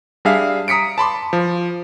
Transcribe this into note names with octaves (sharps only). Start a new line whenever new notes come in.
G3 D4 G#4 E5 F5
A#5 D#6 B6 C#7 D7
A5 B5 C6 D6
F3